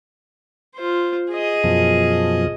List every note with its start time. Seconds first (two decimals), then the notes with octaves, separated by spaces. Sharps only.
0.75 F4 C5
1.31 G#4 D#5
1.64 F#2 B2 F3